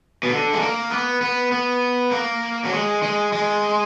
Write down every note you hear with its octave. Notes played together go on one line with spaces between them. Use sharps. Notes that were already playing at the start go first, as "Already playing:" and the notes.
B2
D3
G#3
A#3
B3
B3
B3
A#3
F#3
G#3
G#3
G#3